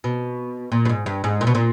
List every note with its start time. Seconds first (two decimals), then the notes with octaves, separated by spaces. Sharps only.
0.04 B2
0.72 A#2
0.85 G2
0.89 G#2
1.06 G2
1.24 G#2
1.41 A#2
1.47 B2
1.55 A#2